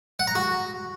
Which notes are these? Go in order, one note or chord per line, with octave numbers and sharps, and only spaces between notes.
F#5
A#5
F#4